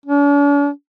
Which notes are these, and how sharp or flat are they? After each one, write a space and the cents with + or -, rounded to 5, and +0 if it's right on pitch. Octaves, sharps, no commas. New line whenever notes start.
D4 -45